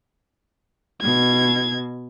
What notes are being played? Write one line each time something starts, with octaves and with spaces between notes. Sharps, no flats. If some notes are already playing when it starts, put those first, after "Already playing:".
B2 G#6